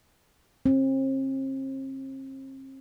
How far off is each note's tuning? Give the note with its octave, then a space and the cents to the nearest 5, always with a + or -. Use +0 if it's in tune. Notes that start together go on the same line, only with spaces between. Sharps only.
C4 +40